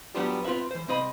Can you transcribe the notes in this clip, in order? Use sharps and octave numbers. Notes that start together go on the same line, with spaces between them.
F#3 G3 B3 D4 F4 G4
C4 F4 F#4 B4 E5
E3 C5
C2 C4 C5 D#5 B5